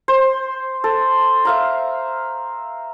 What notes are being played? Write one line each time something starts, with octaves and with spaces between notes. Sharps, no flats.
C5
A4
E5 F5 A#5